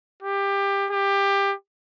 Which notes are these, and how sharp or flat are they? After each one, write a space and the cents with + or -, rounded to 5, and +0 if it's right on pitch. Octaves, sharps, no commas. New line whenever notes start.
G4 +20
G4 +20